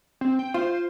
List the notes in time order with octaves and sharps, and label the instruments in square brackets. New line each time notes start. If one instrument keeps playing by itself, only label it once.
[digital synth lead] C4
G5
[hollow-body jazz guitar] F4 [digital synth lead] C5